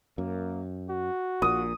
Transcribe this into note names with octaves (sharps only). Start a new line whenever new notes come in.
F#2 A#3
F#4
A#1 A#2 D#6